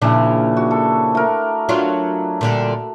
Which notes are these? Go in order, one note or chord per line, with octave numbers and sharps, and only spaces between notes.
A#2 C#3 F3 D4 E4
F#4
A4
A3 A#4
F#3 D4 F4
A#2 D3 G3